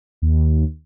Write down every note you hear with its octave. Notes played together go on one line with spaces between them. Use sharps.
D#2